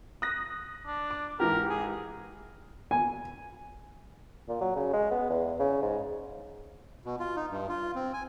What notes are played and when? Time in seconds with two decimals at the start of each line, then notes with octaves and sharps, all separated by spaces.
0.22 D#6 F#6 A#6
0.87 D4
1.11 D6
1.40 G#2 E3 G4 A#4
1.70 G#4
2.91 G#5
4.49 A#2
4.61 F#3
4.76 C#3
4.93 G#3
5.11 B3
5.30 E2
5.60 C#3
5.82 G#2
7.05 B2
7.19 F4
7.36 D#4
7.50 G2
7.69 F4
7.95 C4
8.13 G#5